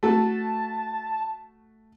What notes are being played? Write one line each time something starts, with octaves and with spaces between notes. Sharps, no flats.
A3 F#4 A4 A5